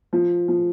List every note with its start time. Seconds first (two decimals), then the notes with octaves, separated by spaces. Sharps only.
0.13 F3
0.48 F3